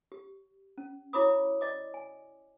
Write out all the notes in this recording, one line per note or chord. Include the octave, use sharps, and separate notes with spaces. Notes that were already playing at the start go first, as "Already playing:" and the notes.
G4
C#4
E4 F#4 C#5 B5 D6 D#6
D5 D#5 D6
G#5